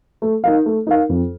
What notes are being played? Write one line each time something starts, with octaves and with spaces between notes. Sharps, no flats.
A3
D#4 A#4 F5
A3
D#4 A#4 F5
F2